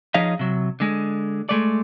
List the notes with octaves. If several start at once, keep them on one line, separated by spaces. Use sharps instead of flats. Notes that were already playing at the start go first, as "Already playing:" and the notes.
F3 D#4 G#4 C#5 D#5 F5
C3 F#3
D3 G#3
G#3 A3 D5